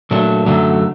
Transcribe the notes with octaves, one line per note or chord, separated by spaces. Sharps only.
A#2 F#3 A3 D4
F#2 D3 F#3 A3